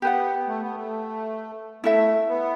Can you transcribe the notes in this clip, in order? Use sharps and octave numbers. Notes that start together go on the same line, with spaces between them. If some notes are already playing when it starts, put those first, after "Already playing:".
B3 G4 B4 F#5
A3
B3
A3
A3 E4 A4 E5
B3